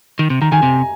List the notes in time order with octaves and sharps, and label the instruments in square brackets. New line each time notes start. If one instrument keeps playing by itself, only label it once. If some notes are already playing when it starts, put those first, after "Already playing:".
[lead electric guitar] D#3
C3
[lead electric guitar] D#3 [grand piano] A#5
[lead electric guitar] D#3 [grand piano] G#5
[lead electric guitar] C3